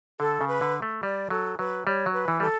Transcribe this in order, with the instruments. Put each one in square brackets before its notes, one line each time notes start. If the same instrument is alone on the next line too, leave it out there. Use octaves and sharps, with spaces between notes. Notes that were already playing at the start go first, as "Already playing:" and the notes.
[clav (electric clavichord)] D3 [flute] A4
[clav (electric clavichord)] C#3
[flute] B4
[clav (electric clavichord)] D3
A3
[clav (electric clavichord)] G3 [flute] D5
[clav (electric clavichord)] F#3 [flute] A4
[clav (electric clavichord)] F#3 [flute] B4
[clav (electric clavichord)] G3 [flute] C#5
[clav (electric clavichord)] F#3
[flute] B4
[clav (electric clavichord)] E3
[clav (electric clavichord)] G3 [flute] A4